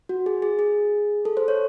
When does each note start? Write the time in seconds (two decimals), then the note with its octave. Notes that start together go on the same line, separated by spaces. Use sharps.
0.09 F#4
0.26 G#4
0.42 G#4
0.59 G#4
1.25 A4
1.37 C5
1.48 C#5